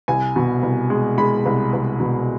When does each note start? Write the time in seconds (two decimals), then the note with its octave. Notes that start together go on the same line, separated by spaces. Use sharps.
0.08 C2 G#5
0.36 B2
0.63 C2
0.90 G#3
1.18 G#3 B5
1.46 C2
1.73 C2
2.00 B2